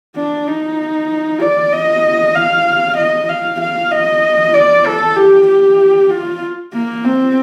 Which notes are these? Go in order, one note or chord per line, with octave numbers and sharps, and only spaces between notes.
D4
D#4
D5
D#5
F5
D#5
F5
F5
D#5
D5
A4
G4
G4
F4
A#3
C4